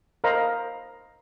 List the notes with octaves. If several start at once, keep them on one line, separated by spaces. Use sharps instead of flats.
A#4 C5 D#5 F5 A#5 B5